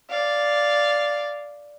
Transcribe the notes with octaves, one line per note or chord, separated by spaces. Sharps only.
D5 F5